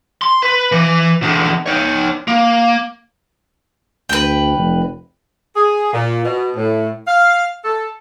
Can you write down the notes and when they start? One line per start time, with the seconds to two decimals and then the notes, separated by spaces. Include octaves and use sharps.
0.22 C6
0.43 B4
0.72 E3
1.23 E2 D3
1.66 D#4 C#5
2.28 A#3
4.09 D2 B4 G5
4.57 F1
5.56 G#4
5.93 A#2
6.25 B2
6.57 A2
7.07 F5
7.64 A4